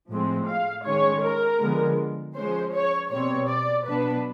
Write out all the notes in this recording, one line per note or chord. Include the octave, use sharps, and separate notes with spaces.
A2 F3 G#3 C4
F5
D#3 G#3 C#4 C#5
A#4
D3 F3 G#3 B3
F3 G#3 C#4 C5
C#5
B2 G3 C4 C#5
D5
B2 F#3 B3 D4 B4